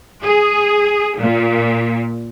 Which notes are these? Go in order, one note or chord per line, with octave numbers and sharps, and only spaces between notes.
G#4
A#2